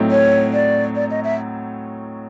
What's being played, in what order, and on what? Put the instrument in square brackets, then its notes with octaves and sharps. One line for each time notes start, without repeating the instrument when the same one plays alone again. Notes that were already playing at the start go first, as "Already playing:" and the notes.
Already playing: [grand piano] A2 F#3 A3 C4 D#4
[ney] C#5
D5
D5
D#5
E5